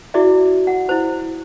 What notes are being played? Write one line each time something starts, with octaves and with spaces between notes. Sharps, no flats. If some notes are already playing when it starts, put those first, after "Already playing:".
E4 F#4 G#4 D5 E5
F#5
E4 C5